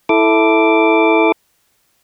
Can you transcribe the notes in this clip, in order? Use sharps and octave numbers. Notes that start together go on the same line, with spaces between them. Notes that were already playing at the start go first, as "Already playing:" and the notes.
E4 A4 D6